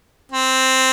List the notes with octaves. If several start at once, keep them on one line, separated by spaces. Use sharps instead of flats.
C4